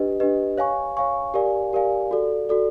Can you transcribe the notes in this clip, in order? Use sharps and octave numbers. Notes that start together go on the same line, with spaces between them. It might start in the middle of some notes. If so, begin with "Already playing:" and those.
Already playing: D4 G4 B4 D#5
D4 G4 B4 D#5
C#5 F5 G#5 C#6
C#5 F5 G#5 C#6
G4 A#4 D5 F5 G#5
G4 A#4 D5 F5 G#5
F#4 A4 D5
F#4 A4 D5